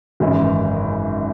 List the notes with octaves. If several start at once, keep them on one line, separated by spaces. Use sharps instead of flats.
G#1 F#2 C#3 E3 G#3